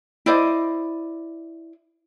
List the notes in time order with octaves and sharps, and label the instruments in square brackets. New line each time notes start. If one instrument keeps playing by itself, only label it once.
[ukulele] E4 C5 D5 D#5